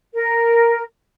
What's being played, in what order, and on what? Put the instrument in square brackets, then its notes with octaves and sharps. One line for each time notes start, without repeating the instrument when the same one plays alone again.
[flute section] A#4